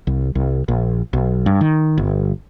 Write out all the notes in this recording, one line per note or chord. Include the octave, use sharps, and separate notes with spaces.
C2
C2
A#1
B1
G2
D#3
G1